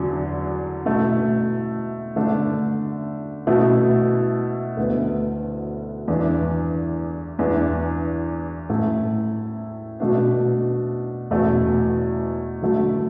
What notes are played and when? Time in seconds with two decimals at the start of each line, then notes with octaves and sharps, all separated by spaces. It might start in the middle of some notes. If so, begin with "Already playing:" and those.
Already playing: E2 D3 F#3
0.86 B2 A3 E4
2.16 D3 A3 D4
3.47 B2 A3 E4
4.77 D2 D3 B3 E4
6.08 E2 E3 D4
7.39 E2 E3 D4
8.69 A2 A3 E4
10.00 B2 A3 D4
11.31 E2 B2 A3
12.62 D3 F#3 A3